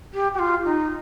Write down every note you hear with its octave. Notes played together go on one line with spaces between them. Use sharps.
G4
G4
F4
D#4